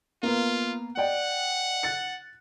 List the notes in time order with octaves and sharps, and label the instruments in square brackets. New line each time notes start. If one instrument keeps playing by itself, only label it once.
[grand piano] A#3 B3 [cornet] F4
[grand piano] D5 D#5 G5 [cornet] F#5
[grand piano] F#6 A6 C#7